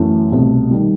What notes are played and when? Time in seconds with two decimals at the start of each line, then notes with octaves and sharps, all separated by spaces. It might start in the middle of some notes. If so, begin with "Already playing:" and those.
Already playing: F#2 E3 A3 E4 A4
0.32 C2 B2 A3
0.71 D#3 G3